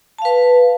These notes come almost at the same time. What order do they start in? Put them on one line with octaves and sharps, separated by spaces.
A5 F5 B4